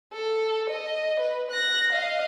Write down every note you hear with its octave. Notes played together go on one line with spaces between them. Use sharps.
A4
D#5
B4
F#6 A#6
D#5 F5